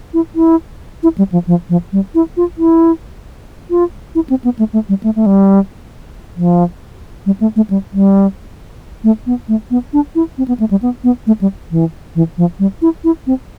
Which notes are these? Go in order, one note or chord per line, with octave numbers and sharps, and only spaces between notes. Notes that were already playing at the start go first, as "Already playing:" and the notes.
E4
E4
E4
G3
F3
F3
F3
G3
E4
F4
E4
F4
E4
C4
B3
A3
A3
G3
A3
A3
G3
F3
G3
A3
A3
G3
G3
A3
B3
A3
B3
D4
E4
C4
B3
A3
G3
B3
B3
A3
G3
E3
E3
F3
G3
E4
E4
C4